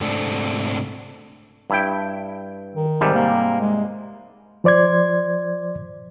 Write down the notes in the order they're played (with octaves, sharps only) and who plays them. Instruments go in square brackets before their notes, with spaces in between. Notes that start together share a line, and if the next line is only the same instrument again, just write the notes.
[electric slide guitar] G#2 C3 A3 C4 D4 A4
[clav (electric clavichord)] G2 E4 G5
[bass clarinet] D#3
[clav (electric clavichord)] G#2 C3 G3
[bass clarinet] A#3
G#3
[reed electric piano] F3 C5 D5 C6 G#6